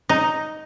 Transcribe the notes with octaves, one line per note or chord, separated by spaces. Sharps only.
D#4